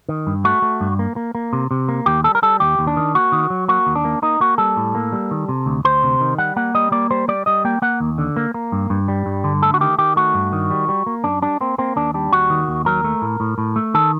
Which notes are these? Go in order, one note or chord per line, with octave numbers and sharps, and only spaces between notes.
D#3
G2
A3 F#4
A3
G2
A#3
A#3
A#3
C3
C3
A#3
D#2 G4
G3 A4
A#4
G3 A4
D#2 G4
D#2
D4
D#3
A#3 F#4
D#3
F#3
A#3 F#4
D#2
D4
A#3
A#3 D#4
A#3 F#4
G3 A4
A2
A#3
G3
D#3
C3
D2
D2 C5
C3
D#3
G3 F#5
A#3 F#5
G3 D#5
A#3 D5
G3 C5
G3 D5
G3 D#5
A#3 G5
A#3 F#5
D#2
D3
A#3
A#3
G2
G2
G3
G2
D3
A3 A4
F#4
D#3 G4
D#3 G4
A3 F#4
G2
D#3
G3
G3
A#3
F#2 D4
G3 D4
A#3 C4
A#3 C4
D#2 D4
G3 D4
D#2 F#4
D#3
D#2
F#3 A#4
A3
A2
A2
A2
A3
D#3 A4